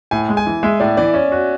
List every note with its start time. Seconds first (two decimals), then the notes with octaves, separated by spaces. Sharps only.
0.11 A2 G#5
0.29 G#3
0.37 G#5
0.46 E3
0.63 G#3 E5
0.80 A2 D5
0.97 E3 D5
1.14 C#4
1.32 F#4